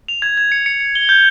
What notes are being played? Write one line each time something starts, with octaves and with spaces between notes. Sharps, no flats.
F7
G#6
G#6
C#7
C#7
C#7
G7
G6